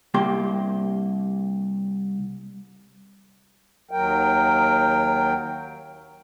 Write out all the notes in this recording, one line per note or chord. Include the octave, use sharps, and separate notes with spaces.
C2 A#3 G4 C6
D#2 F#3 A#4 G5